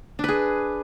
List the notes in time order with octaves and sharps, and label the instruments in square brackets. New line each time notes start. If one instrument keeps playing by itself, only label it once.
[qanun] D4
B4
G#4